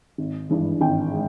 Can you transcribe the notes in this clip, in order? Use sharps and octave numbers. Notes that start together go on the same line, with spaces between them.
G#1
G2 E3 G#3
G#1 G5
G#3